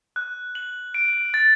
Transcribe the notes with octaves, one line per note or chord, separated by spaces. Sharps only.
F#6
F#7
D7
A6